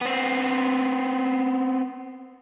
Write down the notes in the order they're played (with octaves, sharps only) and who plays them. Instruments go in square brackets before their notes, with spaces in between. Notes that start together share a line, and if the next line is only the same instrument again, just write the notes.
[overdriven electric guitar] B3 C4